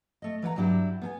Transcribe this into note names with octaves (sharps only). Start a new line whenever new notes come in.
A3 D#5
E3 B4 F#5 A#5
G2 F#3 D4 E4 G4
B3 A4 G#5